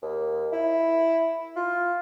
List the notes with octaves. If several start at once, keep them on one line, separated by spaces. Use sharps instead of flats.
D#2
E4
F4